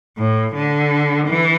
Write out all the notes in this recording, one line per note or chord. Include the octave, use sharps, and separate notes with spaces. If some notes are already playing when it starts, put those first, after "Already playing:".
A2
D3
E3